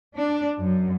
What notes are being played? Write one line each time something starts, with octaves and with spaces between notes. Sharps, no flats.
D4
F#2